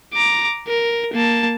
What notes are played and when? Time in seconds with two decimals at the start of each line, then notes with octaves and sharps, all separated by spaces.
0.14 A#5 D6
0.68 A#4
1.13 A#3 A5